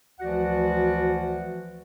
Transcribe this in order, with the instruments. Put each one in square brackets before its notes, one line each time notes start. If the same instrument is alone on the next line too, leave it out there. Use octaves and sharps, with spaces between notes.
[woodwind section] D2 E3 F3 F#4 D5 F#5